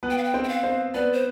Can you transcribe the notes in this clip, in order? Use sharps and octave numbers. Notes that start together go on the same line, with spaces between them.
B3 B4
G5
F5
G5
C4 C5
G5
F5
C4 C5
B3 B4 D5
C5